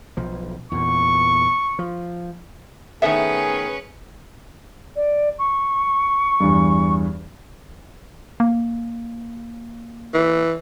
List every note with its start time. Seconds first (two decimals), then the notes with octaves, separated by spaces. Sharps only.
0.17 B1 F3
0.71 E2 A#2 C#6
1.79 F3
3.02 D#3 A3 B3 C#4 G#4 B4 E5
4.96 D5
5.39 C#6
6.40 E2 G2
8.40 A#3
10.14 E3